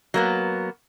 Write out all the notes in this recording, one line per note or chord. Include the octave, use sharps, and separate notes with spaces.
F#3 A#3 B3